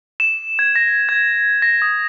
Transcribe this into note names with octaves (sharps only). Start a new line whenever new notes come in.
E7
G#6
A#6
G#6
A#6
D#6